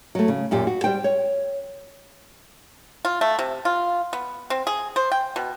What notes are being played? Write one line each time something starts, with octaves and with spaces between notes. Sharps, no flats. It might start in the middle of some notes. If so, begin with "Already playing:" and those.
F#3 A3
C#3
F#2 A#2 G4
F#4
G3 C5 G5
C#5
F4
A3
C3
F4
B3
C4
G#4
C5
G5
B2